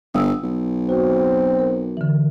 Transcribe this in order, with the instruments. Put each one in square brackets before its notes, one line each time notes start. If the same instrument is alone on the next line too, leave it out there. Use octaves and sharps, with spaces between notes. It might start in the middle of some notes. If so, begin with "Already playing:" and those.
[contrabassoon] G1 [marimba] D#6 E6
[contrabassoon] B1
[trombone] C4 [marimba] F#4 C5
[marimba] A#4
D3 E3